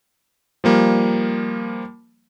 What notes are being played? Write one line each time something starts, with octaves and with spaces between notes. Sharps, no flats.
F3 G3 A#3